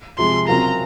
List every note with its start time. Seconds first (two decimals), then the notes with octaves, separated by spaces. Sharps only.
0.18 C3 F3 G#3 C6
0.48 C#3 F#3 C4 F4 A#4 A#5